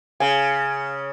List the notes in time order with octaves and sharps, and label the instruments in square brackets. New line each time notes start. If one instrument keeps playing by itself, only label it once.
[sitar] C#3 [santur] G#5